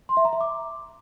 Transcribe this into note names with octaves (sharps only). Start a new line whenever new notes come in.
C6
E5
A#5
E5
D6